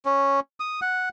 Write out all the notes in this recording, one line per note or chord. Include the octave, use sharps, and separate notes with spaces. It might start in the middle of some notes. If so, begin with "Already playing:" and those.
C#4
D#6
F#5